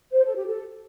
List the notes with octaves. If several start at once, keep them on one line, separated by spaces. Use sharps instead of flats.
C5
A4
G4
A4